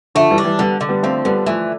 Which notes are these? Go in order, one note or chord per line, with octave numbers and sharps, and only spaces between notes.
D3 F3 A3
E3 G3
D4
E3 G3
D3 G3 B3
D3
G3 B3
F3 A3 C4
D3 G3 B3
E3 F3 A3